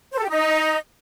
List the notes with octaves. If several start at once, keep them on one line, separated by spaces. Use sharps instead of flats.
C5
A4
G4
D#4